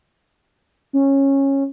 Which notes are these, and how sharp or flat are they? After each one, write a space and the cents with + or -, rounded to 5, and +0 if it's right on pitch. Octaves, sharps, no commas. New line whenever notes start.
C#4 -15